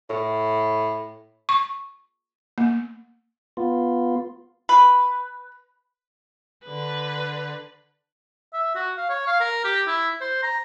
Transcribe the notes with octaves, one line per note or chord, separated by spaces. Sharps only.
A2
C#6
A#3
B3 F4
B4
D3 B4
E5
F#4
F5
C#5
F5
A#4
G4
E4
C5
A#5